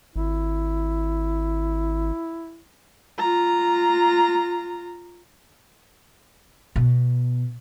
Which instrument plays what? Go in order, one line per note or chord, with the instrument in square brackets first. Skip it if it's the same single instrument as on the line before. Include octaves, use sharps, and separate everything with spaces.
[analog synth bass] G#1 [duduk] E4
[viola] F4 A#5
[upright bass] B2